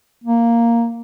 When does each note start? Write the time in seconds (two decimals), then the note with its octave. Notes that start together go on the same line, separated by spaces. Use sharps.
0.24 A#3